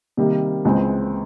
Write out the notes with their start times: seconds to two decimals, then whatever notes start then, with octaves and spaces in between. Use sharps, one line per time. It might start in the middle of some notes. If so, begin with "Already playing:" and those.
0.17 C3 D#3 G3 A#3
0.65 C#2 C#3 E3 G#3 C4